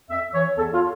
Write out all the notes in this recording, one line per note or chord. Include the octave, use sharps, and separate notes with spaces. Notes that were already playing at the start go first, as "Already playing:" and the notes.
F2 E5
E3 C#5
E2 A4
F4